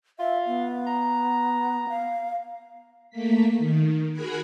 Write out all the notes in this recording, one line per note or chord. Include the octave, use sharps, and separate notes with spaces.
F4 E5
B3
A#5
F5
A3 A#3 B6
D#3
F#4 G#4 A#4 B5 F#6 G#6